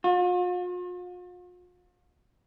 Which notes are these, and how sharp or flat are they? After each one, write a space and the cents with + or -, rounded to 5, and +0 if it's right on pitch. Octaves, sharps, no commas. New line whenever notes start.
F4 +45